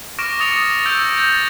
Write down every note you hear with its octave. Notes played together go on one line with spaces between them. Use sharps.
C#6 D6 F6 A#6 D7 E7
D6 D#6 A6 C#7 F7
E6 G6 A#6 D7
G6 A6